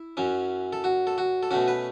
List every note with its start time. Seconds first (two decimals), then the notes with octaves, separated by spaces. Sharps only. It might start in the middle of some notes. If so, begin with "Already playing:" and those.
Already playing: E4
0.17 F#2 F#3 C#4
0.73 A4
0.84 F#4
1.07 A4
1.18 F#4
1.43 A4
1.51 B2 A3 C#4 F#4
1.68 B4